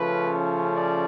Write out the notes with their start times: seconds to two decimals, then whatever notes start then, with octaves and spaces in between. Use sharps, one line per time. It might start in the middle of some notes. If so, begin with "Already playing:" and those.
Already playing: C#3 F3 A3 C#4 B4
0.75 D5